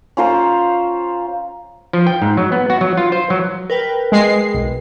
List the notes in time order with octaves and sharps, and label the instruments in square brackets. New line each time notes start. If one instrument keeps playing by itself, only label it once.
[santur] C#4 F4 C5 A#5
[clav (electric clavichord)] F3
G5
G#2
F#3
B3
F#4
F#3
F4
C5
F#3
[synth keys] A#4 B4 G5
[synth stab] G#3 C7
B1